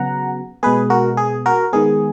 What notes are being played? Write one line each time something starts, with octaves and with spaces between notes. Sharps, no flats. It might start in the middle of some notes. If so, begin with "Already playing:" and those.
Already playing: C#3 F#3 B3 F#5 A#5
B2 G#3 B3 G#4 B4
F#4 A#4
G#4
F#4 A#4
D#3 G#3 B3 G#4